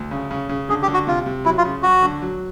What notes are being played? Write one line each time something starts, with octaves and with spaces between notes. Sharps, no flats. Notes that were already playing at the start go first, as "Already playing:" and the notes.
Already playing: D2
C#3
C#3
C#3
D3 G#4
G4
D3
F#4
C3 F4
C3
F#3 E4
F4
C#3
F#3 F#4
D3
F#3